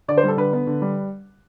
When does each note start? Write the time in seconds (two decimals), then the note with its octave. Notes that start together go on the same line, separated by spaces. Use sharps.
0.08 D3 D5
0.18 C5
0.23 G3 A4
0.37 D3 B4
0.53 B3
0.67 D3
0.82 G3